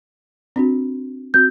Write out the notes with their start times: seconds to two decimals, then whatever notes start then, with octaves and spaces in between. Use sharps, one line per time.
0.56 C4 D4 F#4
1.34 C4 F#4 G6